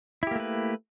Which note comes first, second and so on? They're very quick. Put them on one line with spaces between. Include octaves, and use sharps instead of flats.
E4 G4 A#3 A3 B4